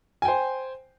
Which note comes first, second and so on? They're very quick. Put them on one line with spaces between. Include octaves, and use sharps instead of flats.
G#5 G5 C5